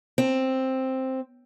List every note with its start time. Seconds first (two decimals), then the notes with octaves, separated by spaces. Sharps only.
0.18 C4